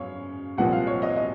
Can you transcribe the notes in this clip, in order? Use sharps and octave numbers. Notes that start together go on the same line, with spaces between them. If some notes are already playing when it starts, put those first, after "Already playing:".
Already playing: F#2 C#3 C#5 F5
C2 A#2 F3 F#5
F5
C#5
D#5
D#5